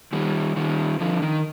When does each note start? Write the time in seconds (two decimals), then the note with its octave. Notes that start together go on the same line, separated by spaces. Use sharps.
0.13 D#3 G3
0.56 D#3 G3
1.00 D3 F3
1.22 D#3